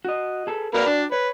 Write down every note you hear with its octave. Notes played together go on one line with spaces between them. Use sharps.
F#4 D#5
G#4 A4 B4
A#3 F#4 A#4 B4 D5 G5
D4
B4 C#5